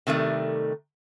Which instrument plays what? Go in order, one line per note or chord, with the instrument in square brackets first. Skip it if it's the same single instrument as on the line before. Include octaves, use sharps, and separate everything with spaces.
[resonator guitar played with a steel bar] C3 D#3 G3 A3